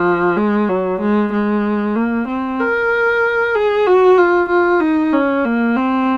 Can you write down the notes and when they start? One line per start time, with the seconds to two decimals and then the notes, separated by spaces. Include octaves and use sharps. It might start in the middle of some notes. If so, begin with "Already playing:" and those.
Already playing: F3
0.37 G#3
0.69 F#3
1.01 G#3
1.33 G#3
1.95 A#3
2.28 C4
2.60 A#4
3.55 G#4
3.87 F#4
4.18 F4
4.49 F4
4.81 D#4
5.13 C#4
5.45 A#3
5.76 C4